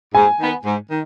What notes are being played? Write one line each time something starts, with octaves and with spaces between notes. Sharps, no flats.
G#2 G#5
D#3 B3
G#2
D#3